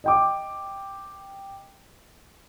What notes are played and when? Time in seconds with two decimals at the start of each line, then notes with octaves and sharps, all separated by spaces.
0.04 D#5 G5 D6